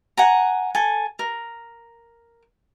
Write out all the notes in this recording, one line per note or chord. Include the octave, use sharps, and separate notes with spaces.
F#5 G#5 A#5
A4 G#5
A#4